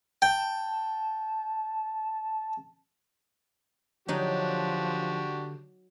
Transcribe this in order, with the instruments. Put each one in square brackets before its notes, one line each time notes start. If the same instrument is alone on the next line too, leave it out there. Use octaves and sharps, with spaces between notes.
[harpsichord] G5 [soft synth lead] A5
[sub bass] D3 [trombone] F3 [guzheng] F#3 D#4 [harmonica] D4 F#4 G4